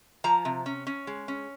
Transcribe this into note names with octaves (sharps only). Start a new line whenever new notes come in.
F3 A#5
C3
C#4
C#4
G#3
C#4